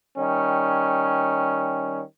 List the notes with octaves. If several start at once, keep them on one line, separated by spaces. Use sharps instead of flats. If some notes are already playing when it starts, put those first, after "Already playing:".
D#3 G3 C#4